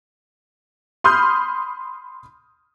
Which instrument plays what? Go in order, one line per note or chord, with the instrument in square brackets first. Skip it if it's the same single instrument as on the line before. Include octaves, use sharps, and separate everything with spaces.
[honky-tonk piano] B5 C6 D#6 F6 G6